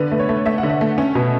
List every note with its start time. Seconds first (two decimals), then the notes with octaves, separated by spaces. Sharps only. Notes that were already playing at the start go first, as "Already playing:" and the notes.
Already playing: D3 B3 B4
0.11 A3
0.19 C#5
0.29 A3
0.46 A3 E5
0.58 F#5
0.63 D3
0.69 E5
0.81 A3
0.98 C#4
1.15 B2